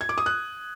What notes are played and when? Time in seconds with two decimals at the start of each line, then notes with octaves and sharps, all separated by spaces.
0.01 G#6
0.09 D6
0.18 D#6
0.26 F#6